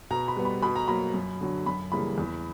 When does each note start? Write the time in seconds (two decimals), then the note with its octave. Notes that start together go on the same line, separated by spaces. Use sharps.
0.11 B2 A#5
0.28 B5
0.36 G3 B3
0.45 B5
0.62 B2 B5
0.76 A#5
0.88 F#3 A#3 B5
1.14 F#2
1.41 D3 F#3
1.66 F#2 B5
1.92 C#3 E3 G3 A#3 B5
2.18 E2